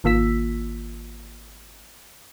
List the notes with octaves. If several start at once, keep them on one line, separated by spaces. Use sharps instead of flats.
G#1 D#3 A#3 F4 E6 B6